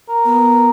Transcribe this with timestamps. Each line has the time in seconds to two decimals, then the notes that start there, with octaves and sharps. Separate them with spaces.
0.09 A#4
0.25 B3